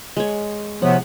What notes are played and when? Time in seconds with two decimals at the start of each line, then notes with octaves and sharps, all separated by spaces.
0.17 G#3 C#5
0.82 A2 C3 F3 B3 C5 C#5 F#5